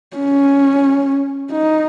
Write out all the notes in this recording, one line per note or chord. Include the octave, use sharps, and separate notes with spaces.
C#4
D#4